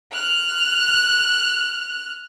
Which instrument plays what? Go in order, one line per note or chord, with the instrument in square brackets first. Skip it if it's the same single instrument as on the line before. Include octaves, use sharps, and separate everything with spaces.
[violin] F6 F#6